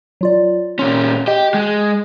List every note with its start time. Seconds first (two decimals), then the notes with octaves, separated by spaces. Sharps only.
0.21 F#3 F4 D5
0.79 A#2 C#4 C6
1.28 G4 D#5
1.54 G#3